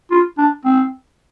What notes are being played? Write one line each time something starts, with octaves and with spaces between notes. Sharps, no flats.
F4
D4
C4